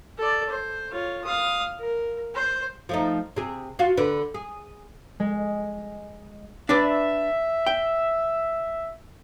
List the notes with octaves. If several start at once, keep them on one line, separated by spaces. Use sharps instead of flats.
A4 D5
C5
F4 C#5
F5 D#6
A#4
C5
F3 A3 D#4
C3 G#4
F4 F#4
D3 B4
G#4
G#3
D4 B4 D5 E5
G5